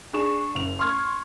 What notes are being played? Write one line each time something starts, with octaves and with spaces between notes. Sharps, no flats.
D4 G#4 C#6 E7
F#1 F7
C6 C#6 F6 G#6